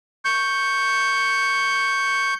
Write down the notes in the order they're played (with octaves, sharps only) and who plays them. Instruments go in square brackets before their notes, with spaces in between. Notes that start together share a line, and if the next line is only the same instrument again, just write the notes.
[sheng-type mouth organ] C#6 G6